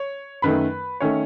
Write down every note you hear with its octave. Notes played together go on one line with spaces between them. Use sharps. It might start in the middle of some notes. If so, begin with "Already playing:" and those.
Already playing: C#5
F#2 D#3 A3 B4 B5
D#3 A3 C#4 C#5